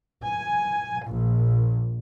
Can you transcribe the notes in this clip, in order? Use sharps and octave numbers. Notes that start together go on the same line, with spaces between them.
G#5
A#1